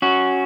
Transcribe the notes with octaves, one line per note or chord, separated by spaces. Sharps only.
C#4 F#4